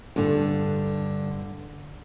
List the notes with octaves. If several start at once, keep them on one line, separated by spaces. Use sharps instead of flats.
G2 D3